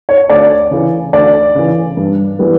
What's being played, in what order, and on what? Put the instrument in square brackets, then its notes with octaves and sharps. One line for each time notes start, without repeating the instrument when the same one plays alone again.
[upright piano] C#5
D2 D5
C#3 E3
D2 D5
C#3 E3
G2
E3 G3 B3